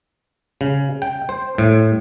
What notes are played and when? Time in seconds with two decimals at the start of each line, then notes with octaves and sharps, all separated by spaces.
0.61 C#3
1.02 G5
1.29 C5
1.58 A2